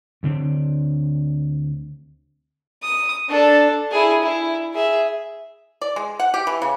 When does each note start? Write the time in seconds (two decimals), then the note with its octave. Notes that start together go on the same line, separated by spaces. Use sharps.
0.23 D2 D3 C4
2.83 D#6
3.28 D4 A4
3.91 E4 G#4
4.22 E4
4.74 G#4 E5
5.82 D5
5.96 G#3
6.20 F#5
6.34 G4
6.47 E3
6.62 C#3